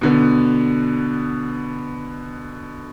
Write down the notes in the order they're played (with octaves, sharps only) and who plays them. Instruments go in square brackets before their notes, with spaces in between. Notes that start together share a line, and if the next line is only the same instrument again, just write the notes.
[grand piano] B2 D3 B3